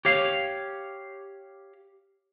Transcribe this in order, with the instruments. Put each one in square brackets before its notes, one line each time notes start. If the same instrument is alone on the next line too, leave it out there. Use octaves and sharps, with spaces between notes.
[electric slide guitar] G4 C#5 F5